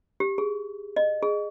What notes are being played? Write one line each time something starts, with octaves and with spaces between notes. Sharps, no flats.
G4
G#4
D#5
G#4